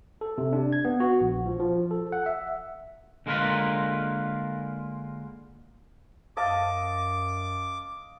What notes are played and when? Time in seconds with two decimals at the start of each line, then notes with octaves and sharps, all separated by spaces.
0.21 A4
0.38 C3
0.53 D4
0.73 G#6
0.85 B3
1.00 F#4
1.21 A#1
1.46 F3
1.60 F3
1.91 A4
2.12 F#5
2.26 E5
3.26 D3 G#3 A#3 F4 A#4 B4
6.37 F#2 D#5 F5 A5 D6